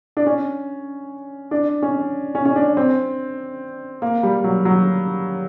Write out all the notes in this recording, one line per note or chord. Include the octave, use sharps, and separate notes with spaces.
D4
C#4
D4
C#4
C#4
C#4
D4
C4
A#3
G3
F#3
F#3